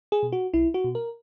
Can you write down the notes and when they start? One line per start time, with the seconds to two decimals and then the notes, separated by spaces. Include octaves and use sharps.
0.12 G#4
0.23 B2
0.32 F#4
0.54 B1 E4
0.74 F#4
0.84 B2
0.95 A#4